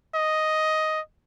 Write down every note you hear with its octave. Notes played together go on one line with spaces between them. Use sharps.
D#5